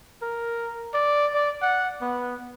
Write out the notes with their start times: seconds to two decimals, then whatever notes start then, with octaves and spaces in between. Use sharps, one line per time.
0.22 A#4
0.94 D5
1.34 D5
1.62 F#5
2.01 B3